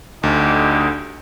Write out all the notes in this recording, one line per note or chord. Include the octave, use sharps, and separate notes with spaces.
D2 D3 D#4 G4